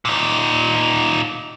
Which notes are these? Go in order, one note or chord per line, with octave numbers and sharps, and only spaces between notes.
A#2 D#4